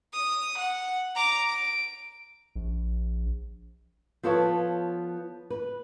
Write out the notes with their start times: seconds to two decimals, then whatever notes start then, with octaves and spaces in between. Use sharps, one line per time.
0.13 D#6
0.58 F#5
1.15 A#5 D6
1.48 D7
2.56 A#1
4.23 F3 B3 F4 A4 B4 C#5
5.50 B4